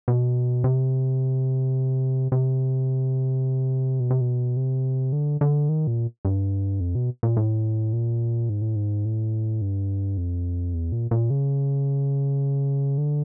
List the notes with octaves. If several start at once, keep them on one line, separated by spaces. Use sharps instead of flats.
B2
C3
C3
B2
C3
B2
C3
D3
D3
D#3
A#2
G2
F2
B2
A#2
A2
A#2
G#2
A2
G#2
A2
G2
F2
E2
A#2
A#2
C#3
D3